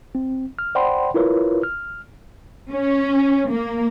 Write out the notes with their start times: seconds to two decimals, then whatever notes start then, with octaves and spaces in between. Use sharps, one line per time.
0.15 C4
0.59 F6
0.75 C5 D5 F#5 G5 B5 C6
1.14 E4 F4 A#4 B4 C#5
1.63 F6
2.71 C#4
3.49 A#3